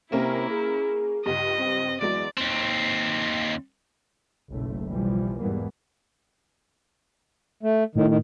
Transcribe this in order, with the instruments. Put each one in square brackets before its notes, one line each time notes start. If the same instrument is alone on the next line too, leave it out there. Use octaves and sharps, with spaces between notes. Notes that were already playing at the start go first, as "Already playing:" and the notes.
[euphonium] C3 [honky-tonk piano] A#3 C#4 A#4 [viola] E4
[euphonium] G#4
[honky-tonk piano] C#2 G2 [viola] D#5
[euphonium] C4
[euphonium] E2 [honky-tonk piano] F#3 G#3 D7 [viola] D5
[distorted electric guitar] D#2 C4
[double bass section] F#1 B1 A3
B1 E3 F3 G3
E2 G#2 E3 G3 A#3 B3
[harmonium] A3
[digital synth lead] A2 [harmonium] D#3
[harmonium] D#3